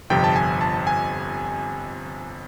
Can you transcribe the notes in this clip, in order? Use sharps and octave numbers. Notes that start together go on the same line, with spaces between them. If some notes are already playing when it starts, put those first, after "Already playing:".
G1 F2 C3 F3 G5
A5
G#5
A5
G#5